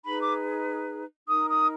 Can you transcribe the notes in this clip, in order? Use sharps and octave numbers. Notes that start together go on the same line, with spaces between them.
D#4 G#4 B4 B5
D6
D#4 A#4 D#6
D#6